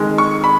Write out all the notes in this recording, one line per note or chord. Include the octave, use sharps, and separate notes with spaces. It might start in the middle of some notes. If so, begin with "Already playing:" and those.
Already playing: F2 D#3 G#3
C#6
B5